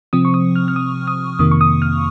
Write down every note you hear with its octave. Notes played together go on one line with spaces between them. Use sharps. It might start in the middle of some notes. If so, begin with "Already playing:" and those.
C3 F3 C4 D#6
C#6
D#6
F6
F6
D#6
D#6
F2 C3 D#3 A#3 D#6
C#6
D#6
F6